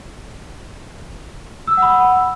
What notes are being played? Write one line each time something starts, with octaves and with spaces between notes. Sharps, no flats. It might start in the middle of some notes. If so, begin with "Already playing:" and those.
F#5 B5 D#6 E6